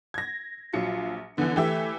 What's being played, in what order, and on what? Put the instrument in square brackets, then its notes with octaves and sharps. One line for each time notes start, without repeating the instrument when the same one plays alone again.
[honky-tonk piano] G#6 A#6
[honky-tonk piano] A#1 F#3 C#7 [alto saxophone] F4
[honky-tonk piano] D3 E3 [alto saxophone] B3
[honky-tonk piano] E3 G4 E5 [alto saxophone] A3